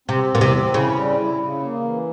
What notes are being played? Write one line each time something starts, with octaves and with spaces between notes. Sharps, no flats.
C3 C4
E2 A#2
C3
C4
C#3 E4
G3
E4
C#3
A#3
E3